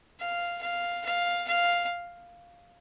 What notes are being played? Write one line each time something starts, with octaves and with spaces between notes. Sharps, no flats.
F5
F5
F5
F5